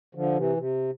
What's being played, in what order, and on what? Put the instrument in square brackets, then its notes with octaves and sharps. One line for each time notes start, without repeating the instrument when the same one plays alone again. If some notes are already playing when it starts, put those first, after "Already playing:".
[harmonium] D3 F3
C3 E3
C3